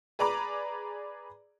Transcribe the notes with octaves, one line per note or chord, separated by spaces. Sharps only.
G#4 B4 D5 A#5 B5 D6